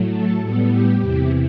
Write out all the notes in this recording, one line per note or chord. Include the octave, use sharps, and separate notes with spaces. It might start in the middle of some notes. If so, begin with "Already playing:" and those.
Already playing: A2 F#3 A3
A4
A2 G3 B3
G4
E2 C3 E3